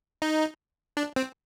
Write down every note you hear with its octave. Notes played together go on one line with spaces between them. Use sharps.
D#4
D4
C4